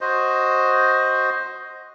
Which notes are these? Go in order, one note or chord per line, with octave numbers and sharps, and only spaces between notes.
F#4 C5 D#5